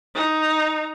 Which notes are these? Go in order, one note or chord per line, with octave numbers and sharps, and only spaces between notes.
D#4